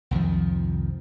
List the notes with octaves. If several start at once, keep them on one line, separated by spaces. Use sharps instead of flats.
C2 F2 D#3 F3